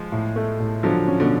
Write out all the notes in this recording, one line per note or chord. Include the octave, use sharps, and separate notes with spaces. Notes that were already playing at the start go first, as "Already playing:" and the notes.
Already playing: F3 G#3
A2
A3
A2
D3 F3 F#3
C#4
B2 D3